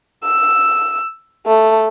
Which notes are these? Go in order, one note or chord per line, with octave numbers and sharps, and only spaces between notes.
E6
A3